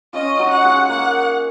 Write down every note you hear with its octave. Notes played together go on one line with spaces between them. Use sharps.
C#4 F4 D#5
D#4 F#4
F#5
F4 G#4
A#3 F#5